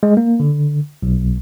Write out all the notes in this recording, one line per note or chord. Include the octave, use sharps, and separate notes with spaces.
G#3
A#3
D3
B1